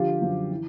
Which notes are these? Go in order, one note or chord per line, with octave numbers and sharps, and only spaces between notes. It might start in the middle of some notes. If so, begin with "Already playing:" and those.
Already playing: D3 F3 F4 G4
F#2 D3 F3
E3